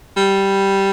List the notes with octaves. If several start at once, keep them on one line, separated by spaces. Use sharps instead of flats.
G3